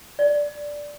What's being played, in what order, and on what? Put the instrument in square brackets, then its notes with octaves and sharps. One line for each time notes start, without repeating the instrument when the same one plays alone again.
[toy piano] D5